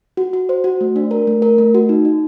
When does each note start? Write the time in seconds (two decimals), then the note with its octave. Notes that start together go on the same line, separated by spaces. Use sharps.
0.17 F#4
0.33 F#4
0.49 C5
0.64 F#4
0.81 A3
0.96 D4
1.11 A#4
1.27 A3
1.42 A#4
1.58 A3
1.74 F#4
1.89 D#4
2.05 D#4